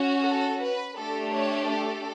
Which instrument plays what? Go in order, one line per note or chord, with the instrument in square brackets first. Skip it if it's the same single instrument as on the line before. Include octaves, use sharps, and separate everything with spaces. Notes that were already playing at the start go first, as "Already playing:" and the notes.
Already playing: [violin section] C#4 F#4
A4
B4
A3 D4 G4 A4
C#5
A4